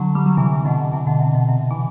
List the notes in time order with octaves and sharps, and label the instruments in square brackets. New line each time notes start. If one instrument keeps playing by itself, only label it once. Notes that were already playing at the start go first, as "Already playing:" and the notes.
Already playing: [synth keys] D3 F#3
G3
F#3
C3 E3
B2 D3
C3 E3
B2 D3
C3
B2
C3
E3